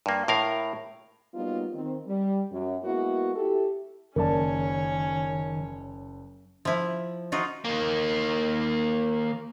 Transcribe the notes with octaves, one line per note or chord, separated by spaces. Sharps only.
G2 A#3
A2 A#4 F5
F#3 G3 A#3 B3 D#4 F4
D#3 C4
G3
F#2
G#3 A#3 B3 E4 F#4
E4 G4 A4
F#1 D#3 C#4 C#5 D5 A5
F3 E4
D#4 F4 F#4
D#3 A#3